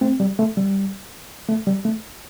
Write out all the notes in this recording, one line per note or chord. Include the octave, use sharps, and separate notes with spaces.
A3 C4
G3
A3
G3
A3
G3
A3